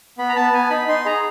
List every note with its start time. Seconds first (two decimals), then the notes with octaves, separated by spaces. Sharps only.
0.18 B3 B5
0.29 A#5
0.36 B3 A5
0.53 B3 G#5
0.70 D#4 B5
0.88 D#4 C6
1.06 G#4 A#5